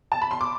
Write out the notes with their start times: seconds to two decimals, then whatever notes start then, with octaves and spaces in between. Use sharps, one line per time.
0.12 A5
0.22 B5
0.31 C6
0.41 D6